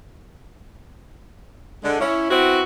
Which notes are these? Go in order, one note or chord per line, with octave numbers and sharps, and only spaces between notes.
D3 G#3
C#4 E4
B3 C4 E4 F#4